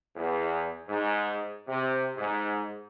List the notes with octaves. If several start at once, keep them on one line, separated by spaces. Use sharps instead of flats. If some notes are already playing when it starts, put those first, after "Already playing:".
E2
G#2
C3
G#2